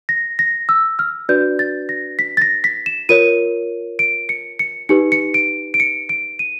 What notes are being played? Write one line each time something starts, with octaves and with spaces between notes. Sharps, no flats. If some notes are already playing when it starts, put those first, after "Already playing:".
A#6
A#6
E6
F6
D4 F#4 B4 D5 G6
A6
A#6
B6
A6
A#6
B6
E7
F4 A#4 C#5 D#7
D7
C#7
C#7
D#4 G4 B4 C#7
C#7
D7
D7
C#7
D7
D#7